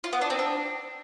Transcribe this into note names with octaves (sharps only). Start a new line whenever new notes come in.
F4
B3
D4
C4
D4